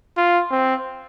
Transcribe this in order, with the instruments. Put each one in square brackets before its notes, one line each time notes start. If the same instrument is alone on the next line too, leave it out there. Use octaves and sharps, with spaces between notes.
[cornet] F4
C4